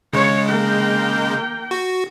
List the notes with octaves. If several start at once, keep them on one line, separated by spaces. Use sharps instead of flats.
C#3 G#3 C#5
A#3 G5
F#4